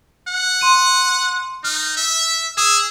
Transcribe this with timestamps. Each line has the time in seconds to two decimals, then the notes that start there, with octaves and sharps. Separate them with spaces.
0.28 F#5
0.61 C6 D#7
1.64 D#4 F6
1.97 E5
2.57 G#4 D#6 E6 E7